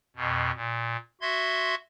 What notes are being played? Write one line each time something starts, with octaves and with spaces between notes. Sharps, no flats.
F2 B2
A#2
F#4 E5 C6 G#6